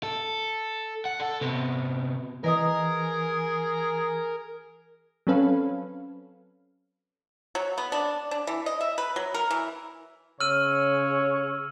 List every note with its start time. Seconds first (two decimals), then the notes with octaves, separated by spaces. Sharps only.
0.03 A4
1.05 F#5
1.20 A4
1.41 C3 B3
2.44 E3 G#4 A#4 B4 D#5 D#6
5.27 F#3 C4 C#4 A4 B4 F5
7.55 F#3
7.78 B3
7.92 D4
8.31 D4
8.47 E3
8.66 D#5
8.81 E5
8.98 B4
9.16 F#3
9.34 A#4
9.51 E3
10.40 C#3 C#5 E6 F6 D#7